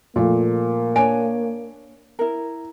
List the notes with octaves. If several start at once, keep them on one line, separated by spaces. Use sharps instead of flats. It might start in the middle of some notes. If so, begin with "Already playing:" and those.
A#2 F3 A3 A#3
D4 C#5 G#5 D7
E4 A#4